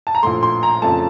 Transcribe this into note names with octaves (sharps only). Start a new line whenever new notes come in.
A5
A#5
A#1 A2 A3 C6
C6
A#5
F2 C#3 A3 A5